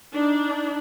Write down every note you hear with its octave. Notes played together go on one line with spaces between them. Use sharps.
D4 D#4